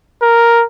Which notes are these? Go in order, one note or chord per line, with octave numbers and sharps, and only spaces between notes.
A#4